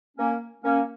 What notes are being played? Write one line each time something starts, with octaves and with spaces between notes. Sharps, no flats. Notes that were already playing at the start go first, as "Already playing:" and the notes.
A#3 C#4
A#3 C#4